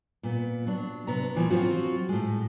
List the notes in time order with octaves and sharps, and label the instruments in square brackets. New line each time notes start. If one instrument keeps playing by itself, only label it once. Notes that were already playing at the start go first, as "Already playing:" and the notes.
[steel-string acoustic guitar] A#2 B3
F#3 D4
C3 B3 A#5
A#2 E3 F3 A#3
F#3 C4 F4 F#4
A2 G#3